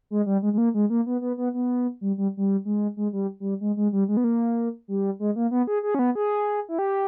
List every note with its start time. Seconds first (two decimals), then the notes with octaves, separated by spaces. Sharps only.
0.11 G#3
0.26 G3
0.42 G#3
0.53 G#3
0.58 A#3
0.74 G#3
0.90 A#3
1.06 B3
1.21 B3
1.37 B3
1.54 B3
2.01 G3
2.18 G3
2.37 G3
2.65 G#3
2.97 G#3
3.13 G3
3.40 G3
3.61 G#3
3.77 G#3
3.93 G3
4.08 G#3
4.17 B3
4.24 A#3
4.88 G3
5.20 G#3
5.36 A#3
5.51 B3
5.67 G#4
5.83 G#4
5.95 C#4
5.99 B3
6.15 G#4
6.69 E4
6.79 G4